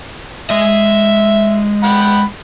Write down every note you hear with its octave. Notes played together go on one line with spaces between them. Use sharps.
G#3 D#5 E5
F#5 G5 B5